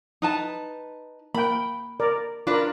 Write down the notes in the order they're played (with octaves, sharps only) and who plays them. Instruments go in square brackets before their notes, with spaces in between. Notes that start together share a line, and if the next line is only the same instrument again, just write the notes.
[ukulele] D#4 B4 A5
[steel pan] A#3 G5 [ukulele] B5
[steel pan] A#4 D5
[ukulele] D4 B4 [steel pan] F4 A#4